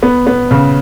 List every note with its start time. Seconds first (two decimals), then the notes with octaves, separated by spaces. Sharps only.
0.03 B3
0.27 B3
0.51 C#3